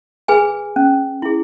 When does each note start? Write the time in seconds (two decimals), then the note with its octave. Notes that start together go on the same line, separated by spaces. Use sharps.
0.28 G#4 B4 G#5
0.76 C#4
1.22 E4 G#4